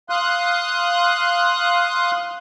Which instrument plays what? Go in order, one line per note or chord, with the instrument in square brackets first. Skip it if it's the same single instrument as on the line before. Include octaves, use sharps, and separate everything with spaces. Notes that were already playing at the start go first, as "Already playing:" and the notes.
[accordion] F5 C6 D#6 F#6